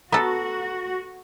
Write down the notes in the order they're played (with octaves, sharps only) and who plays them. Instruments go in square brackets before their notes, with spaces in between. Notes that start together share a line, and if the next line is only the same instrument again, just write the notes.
[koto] B3 A4 [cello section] F#4 [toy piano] A#5 E6